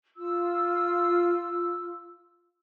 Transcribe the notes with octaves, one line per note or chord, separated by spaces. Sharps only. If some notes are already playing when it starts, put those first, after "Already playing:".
F4 E6